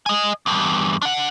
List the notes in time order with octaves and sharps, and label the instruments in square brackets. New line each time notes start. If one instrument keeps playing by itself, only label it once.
[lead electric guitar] D#5 G#5
E2 G2
D4 F#5